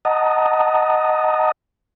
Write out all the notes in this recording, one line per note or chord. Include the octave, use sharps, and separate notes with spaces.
D#5 F#5 A5 A#5 D#6